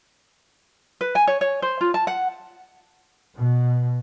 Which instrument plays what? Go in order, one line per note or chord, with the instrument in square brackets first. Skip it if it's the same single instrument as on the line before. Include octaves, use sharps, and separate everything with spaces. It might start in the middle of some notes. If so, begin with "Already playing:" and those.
[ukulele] B4
G#5
C#5
C#5
C5
F4
A5
F#5
[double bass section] B2